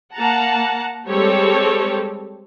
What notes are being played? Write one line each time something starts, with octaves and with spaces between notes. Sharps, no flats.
A#3 F#5 A5 A#5
G3 G#3 C4 G4 A4 C#5